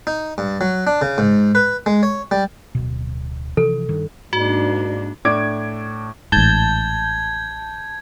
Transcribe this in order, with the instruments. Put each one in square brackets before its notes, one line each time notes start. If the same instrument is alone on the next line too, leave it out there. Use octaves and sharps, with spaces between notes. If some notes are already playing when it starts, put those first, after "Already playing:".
[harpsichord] D#4
G2
F#3
D4
C#3
G#2
B4
G#3
C#5
G3
[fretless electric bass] D1 B2
[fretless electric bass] C3 E3 F3 [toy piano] A4
[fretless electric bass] G2 D#3
[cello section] G#2 A#3 D4 [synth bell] F#4
[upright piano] A2 D4 D6 G#6 D7
[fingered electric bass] A1 G#2 [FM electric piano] A5 G6 [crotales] G#6